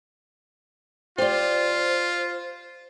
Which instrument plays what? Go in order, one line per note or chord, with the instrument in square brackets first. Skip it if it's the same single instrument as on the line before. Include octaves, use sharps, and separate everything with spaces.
[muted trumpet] F4 [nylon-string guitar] G4 D5 [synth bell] C5